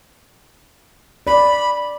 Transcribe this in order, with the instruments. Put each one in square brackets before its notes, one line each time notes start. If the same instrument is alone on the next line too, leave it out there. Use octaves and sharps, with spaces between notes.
[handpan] D5 [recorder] B5